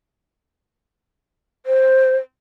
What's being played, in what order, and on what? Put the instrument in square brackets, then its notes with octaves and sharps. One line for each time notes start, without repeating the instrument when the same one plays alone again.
[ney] C5